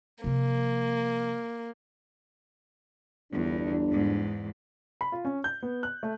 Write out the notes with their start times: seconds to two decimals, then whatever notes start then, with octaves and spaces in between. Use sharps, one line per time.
0.24 C3 F3 A#3
3.32 G1 E2 D4
3.90 E2 G#2
5.01 B5
5.12 F4
5.25 C#4
5.44 G6
5.63 B3
5.83 F#6
6.03 A3